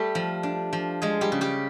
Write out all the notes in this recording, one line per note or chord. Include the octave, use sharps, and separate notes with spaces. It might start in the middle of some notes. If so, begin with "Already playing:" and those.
Already playing: G3 A3 G4
F3
D4
F3
F3 G#3 G#4
G3 G4
C#3
G3 G4